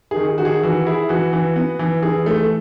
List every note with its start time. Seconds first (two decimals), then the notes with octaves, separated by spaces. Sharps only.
0.11 D#3 G#4
0.28 G#4
0.38 D#3 F#4
0.45 G#4
0.63 E3 F#4
0.86 E4 G#4
1.09 E3 F#4
1.33 E3
1.56 B3
1.79 E3
2.02 E3 G#4
2.26 A3
2.37 A4